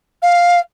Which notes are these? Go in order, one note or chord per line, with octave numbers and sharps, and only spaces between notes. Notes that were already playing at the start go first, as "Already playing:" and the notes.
F5